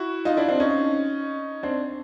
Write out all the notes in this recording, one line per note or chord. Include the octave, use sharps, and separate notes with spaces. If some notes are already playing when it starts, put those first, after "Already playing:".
Already playing: E4 F#4
D#4 F4
D4 E4
C4 D4
C#4 D#4
C4 D4